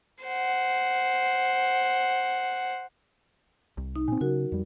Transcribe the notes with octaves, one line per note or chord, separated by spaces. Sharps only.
C5 F#5
C2
D#4
A#2 C4 G#5
C#3 F#3 F#4 A#4
F2 G3